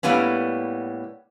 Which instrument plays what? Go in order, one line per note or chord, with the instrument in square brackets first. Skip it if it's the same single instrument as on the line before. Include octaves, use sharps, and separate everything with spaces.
[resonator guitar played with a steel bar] A2 G3 A#3 B3 C#4